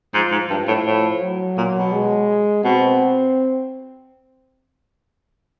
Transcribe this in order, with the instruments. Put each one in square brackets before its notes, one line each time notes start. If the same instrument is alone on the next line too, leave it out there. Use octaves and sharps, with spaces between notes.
[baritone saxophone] G#2 [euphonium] F3
[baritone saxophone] G#2
[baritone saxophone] G2 [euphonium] F3
[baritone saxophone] A2
A2
[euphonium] F#3
[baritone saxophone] A#2
B2
[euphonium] G#3
[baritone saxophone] B2 [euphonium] C4